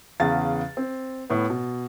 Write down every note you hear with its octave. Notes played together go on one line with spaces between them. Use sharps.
E2 C#3 F5 F#5 A6
C4
A2 B3
B2